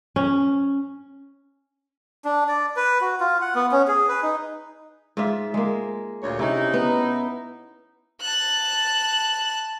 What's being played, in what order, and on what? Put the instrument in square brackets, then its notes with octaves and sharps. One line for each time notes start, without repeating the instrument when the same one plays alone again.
[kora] C#4
[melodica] D4
D5
B4
F#4
F4
F#5
B3
C#4
G#4
B4
D#4
[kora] G#2 F4 E5
G#3 A#3
[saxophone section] D2 A#2 C#5
[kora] C3 C#4 [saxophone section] D#4 E4
[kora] B3
[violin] A5 F#6